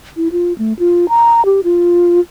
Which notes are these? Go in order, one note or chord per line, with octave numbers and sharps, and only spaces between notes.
E4
F4
A3
F4
A#5
G4
F4